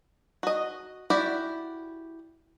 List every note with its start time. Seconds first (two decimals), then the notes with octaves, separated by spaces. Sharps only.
0.43 F#4 D#5
1.10 E4 F#4 G4 D5